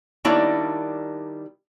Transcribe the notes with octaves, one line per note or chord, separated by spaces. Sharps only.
D#3 G3 A#3 D4 E4 C#5